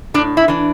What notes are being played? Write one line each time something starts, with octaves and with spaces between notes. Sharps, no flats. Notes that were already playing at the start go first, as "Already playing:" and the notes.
A2 D4 D5
E4
E3 D4